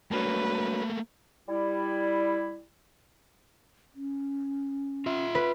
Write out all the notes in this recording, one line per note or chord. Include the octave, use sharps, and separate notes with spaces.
G2 F#3 A3 A#3 B4
G3 E4
C#4
F4 E5
B4